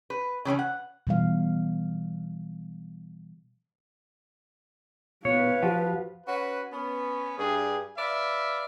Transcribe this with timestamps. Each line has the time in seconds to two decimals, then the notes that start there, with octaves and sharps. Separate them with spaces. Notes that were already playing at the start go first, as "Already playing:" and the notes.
0.10 B4
0.45 C#3 E3 C4 C#4
0.59 F#5
1.07 B2 E3 G3 F5
5.25 A#2 B3 B4 C#5 F5
5.63 F3 F#4 G4 F#5
6.26 C#4 F#4 B4
6.73 B3 C#4
7.38 G2 G#4
7.97 B4 D5 E5 F5